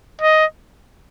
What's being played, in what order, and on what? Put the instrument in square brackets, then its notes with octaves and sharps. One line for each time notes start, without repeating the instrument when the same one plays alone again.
[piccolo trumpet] D#5